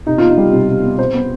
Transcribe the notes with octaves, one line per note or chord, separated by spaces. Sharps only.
C3 D#4
B3 F4
D#4
G3
C3
C3
B3
C3 C5
B3